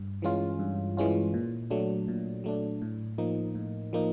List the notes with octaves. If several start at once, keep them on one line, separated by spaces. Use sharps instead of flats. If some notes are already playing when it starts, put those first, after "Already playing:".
Already playing: G2
E3 G#3 C#4 F4
G2
E3 G#3 C#4 F4
A#2
F#3 A3 D4
A#2
F#3 A3 D4
A2
F3 A#3 D#4
A2
F3 A#3 D#4